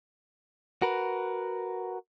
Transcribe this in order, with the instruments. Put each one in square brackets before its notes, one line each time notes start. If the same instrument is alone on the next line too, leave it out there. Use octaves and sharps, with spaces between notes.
[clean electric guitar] F#4 A#4 B4